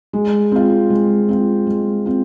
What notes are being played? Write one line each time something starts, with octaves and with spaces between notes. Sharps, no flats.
G#3
C4 F4
G#3
C4 F4
G#3
C4 F4